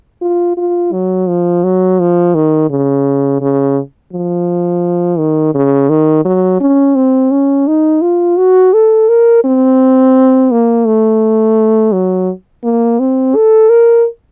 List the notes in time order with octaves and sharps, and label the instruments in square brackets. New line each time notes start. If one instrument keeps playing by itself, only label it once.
[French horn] F4
F4
F#3
F3
F#3
F3
D#3
C#3
C#3
F3
D#3
C#3
D#3
F#3
C#4
C4
C#4
D#4
F4
F#4
A4
A#4
C4
A#3
A3
F#3
A#3
C4
A4
A#4